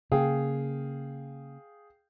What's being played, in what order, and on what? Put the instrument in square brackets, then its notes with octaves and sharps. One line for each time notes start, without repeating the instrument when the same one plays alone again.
[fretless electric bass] C#3 A#3 [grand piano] G#4 F5 G5